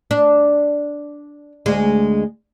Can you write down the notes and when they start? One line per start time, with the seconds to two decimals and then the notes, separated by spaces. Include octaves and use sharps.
0.11 D4
1.66 D2 G#3